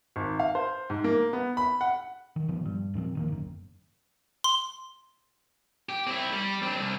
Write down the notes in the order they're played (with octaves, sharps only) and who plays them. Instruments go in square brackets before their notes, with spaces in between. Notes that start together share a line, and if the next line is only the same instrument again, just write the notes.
[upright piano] G#1
F5
C5
G#2
A#3
B3
B5
F#5
[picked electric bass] D#3
A#2 D#3 F3 B3
G2
F1 A#2 F3 C4
D3 D#3 A#3
G1 F#2
[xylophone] C6
[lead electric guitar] G4
C4 E4
G3
C4 D4
C2